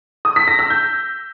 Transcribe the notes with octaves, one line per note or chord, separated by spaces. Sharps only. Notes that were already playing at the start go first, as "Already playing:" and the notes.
D#6
B6
A#6
E6
G6